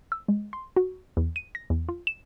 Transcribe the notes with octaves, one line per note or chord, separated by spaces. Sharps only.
E6
G#3
C6
F#4
E2
D#7
A#6
E2
F4
E7